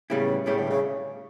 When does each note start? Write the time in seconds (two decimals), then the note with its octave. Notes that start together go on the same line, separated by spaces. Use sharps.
0.10 A2 C#3 G3 B3 E4 G4
0.46 A2 C#3 G3 B3 E4 G4
0.58 D3
0.70 C#3